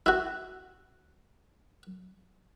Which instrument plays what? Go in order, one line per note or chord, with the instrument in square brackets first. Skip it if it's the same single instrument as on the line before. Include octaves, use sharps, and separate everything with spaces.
[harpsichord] E4 F#4